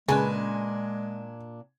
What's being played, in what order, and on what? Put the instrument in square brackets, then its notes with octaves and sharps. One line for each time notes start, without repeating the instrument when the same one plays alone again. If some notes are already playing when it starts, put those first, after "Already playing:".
[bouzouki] A#2 D4 [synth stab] C#3 B4 [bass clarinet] G#3 [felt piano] G#5